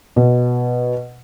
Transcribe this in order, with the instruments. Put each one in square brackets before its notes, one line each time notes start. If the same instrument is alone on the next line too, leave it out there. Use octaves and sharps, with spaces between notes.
[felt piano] B2